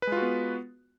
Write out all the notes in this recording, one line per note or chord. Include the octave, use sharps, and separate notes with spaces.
G#3 B3 F4 F#4 B4